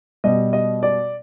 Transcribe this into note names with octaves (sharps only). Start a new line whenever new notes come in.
B2 G3 D#5
D#5
D5